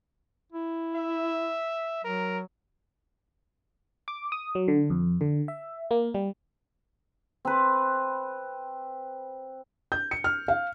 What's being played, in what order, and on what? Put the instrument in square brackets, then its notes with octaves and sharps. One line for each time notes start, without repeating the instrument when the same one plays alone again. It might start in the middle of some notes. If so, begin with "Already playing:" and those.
[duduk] E4
[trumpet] E5
[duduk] F#3 [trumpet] A#4
[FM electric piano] D6
D#6
F#3
D3
F2
D3
E5
A#3
G3
[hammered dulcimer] C4 B4
[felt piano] G6
C#7
F6
F5